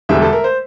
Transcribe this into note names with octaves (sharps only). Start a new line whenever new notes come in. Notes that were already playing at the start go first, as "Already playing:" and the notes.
E1 E2 D3 G3 E5
A4
A#4
C5